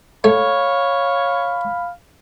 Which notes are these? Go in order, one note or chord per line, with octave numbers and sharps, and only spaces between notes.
A3 C#5 F5 B5